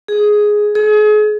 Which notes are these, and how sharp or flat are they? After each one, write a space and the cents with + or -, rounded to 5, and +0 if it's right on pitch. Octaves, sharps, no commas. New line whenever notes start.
G#4 +5
G#4 +35